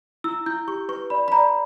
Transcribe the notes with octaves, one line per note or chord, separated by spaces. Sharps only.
E4 E6
E4 G6
G4 C#6
B4 C#6
D5 B5
B5
D5 A#5